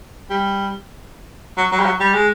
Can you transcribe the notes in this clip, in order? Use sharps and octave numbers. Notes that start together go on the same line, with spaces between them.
G3
F#3
F#3
G3
F#3
G3
G#3